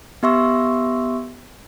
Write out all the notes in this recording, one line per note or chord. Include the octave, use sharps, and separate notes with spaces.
B3 G4 E5 C6 C#6 E6